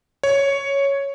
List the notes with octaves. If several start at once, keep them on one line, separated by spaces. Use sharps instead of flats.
C#5